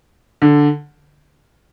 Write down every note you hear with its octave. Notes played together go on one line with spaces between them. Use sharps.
D3